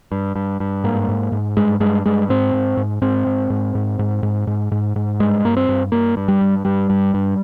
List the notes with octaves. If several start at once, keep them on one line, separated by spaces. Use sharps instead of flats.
G2
G2
G2
G#2 A#3
G#2
G#2
G2 G#3
G2 G#3
G2 G#3
G#2 C4
G#2
G#2
G#2 C4
G#2
G#2
G#2
G#2
G#2
G#2
G#2
G#2
G2 G#3
G2 A#3
C4
G2
G2 A#3
G2
G3
G2
G2 G3
G2
G2